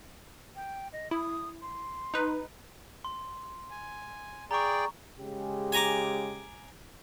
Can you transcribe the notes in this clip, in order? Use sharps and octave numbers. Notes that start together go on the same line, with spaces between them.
G5
D#5
E4 D#6
C6
D#4 B4
C6
G#5
G#4 D5 G5 A#5 C#6
C#3 G#3 G4
G#5 A#5 D6